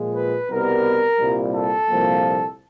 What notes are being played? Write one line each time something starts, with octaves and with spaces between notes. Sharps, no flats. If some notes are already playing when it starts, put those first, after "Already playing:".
Already playing: A#2 F3 G#3
B4
C2 B2 G3 B3 A#4
C2 A#2 G3
A4
C2 A#2 F3 A#3